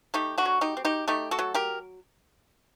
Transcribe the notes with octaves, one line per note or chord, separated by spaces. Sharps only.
A3 D#4 G4
D4 F#4
F#3
D#4 G4
C4
D#4 G4
A3 D#4 G4
F#4 A4
F#3
G4 A#4